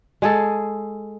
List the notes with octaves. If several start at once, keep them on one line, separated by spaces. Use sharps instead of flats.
G#3 G#4 A4